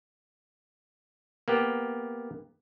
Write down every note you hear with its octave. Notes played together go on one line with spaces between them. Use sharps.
A#3 B3 G4